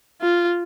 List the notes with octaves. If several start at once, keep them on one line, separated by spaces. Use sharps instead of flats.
F4